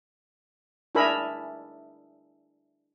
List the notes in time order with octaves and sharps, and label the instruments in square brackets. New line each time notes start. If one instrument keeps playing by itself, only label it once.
[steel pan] D4 E4 G#4 A#4 E5 B5